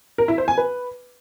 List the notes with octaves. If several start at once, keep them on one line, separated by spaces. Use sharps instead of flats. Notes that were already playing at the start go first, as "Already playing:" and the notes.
A#4
E4
C5
G#5
B4